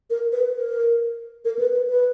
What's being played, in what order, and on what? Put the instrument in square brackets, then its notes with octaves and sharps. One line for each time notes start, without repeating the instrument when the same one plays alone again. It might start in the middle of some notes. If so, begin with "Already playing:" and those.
[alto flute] A#4
B4
A#4
A#4
B4
B4
B4